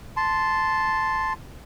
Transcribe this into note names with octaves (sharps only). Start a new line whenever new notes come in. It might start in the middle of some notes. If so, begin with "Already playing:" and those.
A5 C6